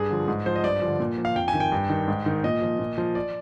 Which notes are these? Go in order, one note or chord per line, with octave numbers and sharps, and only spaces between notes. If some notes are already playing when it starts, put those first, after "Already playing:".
Already playing: G2 G#4
D3 F3
G#2
F3 C5
D#5
G2 D5
D3 F3
A#2
F3
F5
F2 G5
G#5
D#3
G5
G2
D#3
G#2
D#3
A#2 D#5
F3
A#2
F3
D5